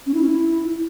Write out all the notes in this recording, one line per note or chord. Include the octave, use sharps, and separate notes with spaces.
C#4
E4
C#4
E4